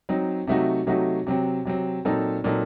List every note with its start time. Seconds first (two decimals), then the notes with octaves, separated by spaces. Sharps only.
0.09 F#3 C4 D#4
0.47 C3 F#3 A3 D#4 F#4
0.87 C3 F#3 A3 D#4 F#4
1.27 C3 F#3 C4
1.65 C3 F#3 C4
2.05 A#2 F#3 C4 D#4 A4
2.44 A#2 F#3 C4 D#4 A4